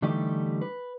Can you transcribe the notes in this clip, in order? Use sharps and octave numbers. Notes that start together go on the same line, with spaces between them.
D3 E3 G3 A3 D#4 G4
B4